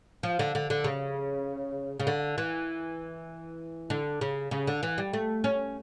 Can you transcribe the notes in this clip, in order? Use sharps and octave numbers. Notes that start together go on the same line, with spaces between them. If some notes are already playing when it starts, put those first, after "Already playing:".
F3
D3
D3
D3
C#3
C#3
D3
E3
D3
C#3
C#3
D3
E3
G3
A3
C#4